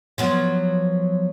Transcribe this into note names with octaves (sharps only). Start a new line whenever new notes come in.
F3 F#3 B3